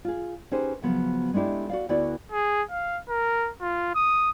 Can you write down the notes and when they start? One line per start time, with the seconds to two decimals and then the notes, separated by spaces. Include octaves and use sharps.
0.05 F4 G#4
0.51 C#4 D#4 G4 G#4 B4 C5
0.82 C#3 F3 F#3 B3
1.34 G#3 A3 D4 E4 G4
1.69 F#4 D5 F5
1.89 D2 B3 E4 F#4 D5
2.32 G#4
2.71 F5
3.09 A#4
3.61 F4
3.95 D#6